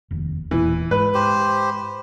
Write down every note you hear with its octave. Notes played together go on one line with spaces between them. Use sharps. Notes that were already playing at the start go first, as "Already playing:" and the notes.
F1 D#2
E1 A#2 E3
G#2 B4
G4 C5